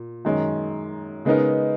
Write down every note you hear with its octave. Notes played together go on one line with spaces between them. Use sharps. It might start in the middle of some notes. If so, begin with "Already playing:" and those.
Already playing: A#2
F#2 D#3 G#3
C#3 G#3 B3 D#4 A#4